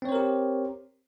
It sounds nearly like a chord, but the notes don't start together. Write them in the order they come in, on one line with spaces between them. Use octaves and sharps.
C4 C#5 C5 A#4 G4